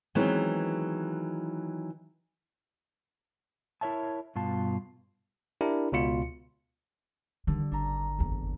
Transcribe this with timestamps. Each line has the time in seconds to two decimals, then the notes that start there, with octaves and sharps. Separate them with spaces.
0.15 D#3 E3 F#3 G#3 B3 C4
3.81 E4 A#4 C#5 E5 A5
4.36 G2 B2 F4 A5
5.61 D4 E4 G4 A#4
5.92 C#2 B2 F4 C#7
7.47 D3 D#3 G3
7.71 G#1 D4 A#5
8.19 F#1 E2